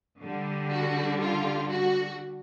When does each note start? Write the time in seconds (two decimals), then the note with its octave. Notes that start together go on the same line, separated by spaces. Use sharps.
0.22 D3 G3
0.71 F#4
1.20 F4
1.69 F#4